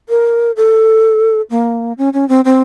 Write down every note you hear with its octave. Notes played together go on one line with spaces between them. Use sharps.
A#4
A4
A#3
C#4
C#4
C4
C4